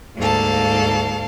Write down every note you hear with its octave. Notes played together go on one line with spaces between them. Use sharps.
D2 G#2 A#3 A4 F5 A5